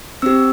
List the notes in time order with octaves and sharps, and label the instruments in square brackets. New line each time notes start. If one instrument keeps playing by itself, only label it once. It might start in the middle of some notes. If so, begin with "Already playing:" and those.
[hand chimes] C4 G4 E6